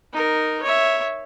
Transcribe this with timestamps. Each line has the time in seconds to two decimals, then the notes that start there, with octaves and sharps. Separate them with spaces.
0.13 D#4 A#4
0.63 C#5 E5